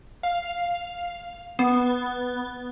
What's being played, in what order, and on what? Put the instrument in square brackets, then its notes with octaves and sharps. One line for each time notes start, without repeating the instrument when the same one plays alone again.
[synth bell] F5
B3